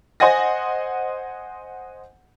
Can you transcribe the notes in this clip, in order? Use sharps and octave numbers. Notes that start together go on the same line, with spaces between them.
C5 D#5 F#5 G#5 A#6